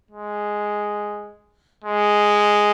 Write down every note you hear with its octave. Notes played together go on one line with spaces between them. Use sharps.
G#3
G#3